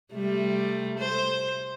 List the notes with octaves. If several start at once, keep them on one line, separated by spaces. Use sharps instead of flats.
C3 G3 A3
C5